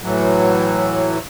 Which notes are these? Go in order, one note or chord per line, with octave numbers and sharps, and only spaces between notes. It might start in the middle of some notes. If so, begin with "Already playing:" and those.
A2 E3 F#3